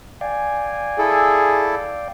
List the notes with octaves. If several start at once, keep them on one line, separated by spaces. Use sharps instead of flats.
D5 F5 G5 G#5
E4 G#4 A4